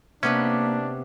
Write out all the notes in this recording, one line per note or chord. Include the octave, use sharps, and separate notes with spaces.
C3 A#3 B3 C#4 D4 B4